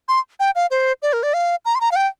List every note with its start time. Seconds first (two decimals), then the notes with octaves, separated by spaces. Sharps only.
0.08 C6
0.40 G5
0.55 F5
0.71 C5
1.02 D5
1.13 A#4
1.23 D5
1.34 F5
1.65 A#5
1.75 C6
1.81 A#5
1.92 F5
1.96 G5